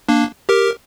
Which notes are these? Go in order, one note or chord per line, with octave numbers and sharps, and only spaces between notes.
A#3 D4
G4 A#4